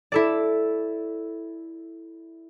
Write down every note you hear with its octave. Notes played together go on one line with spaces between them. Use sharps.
E4 A4 D5